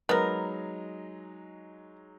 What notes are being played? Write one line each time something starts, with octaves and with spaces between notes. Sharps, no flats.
F#3 G#3 B3 D#4 A#4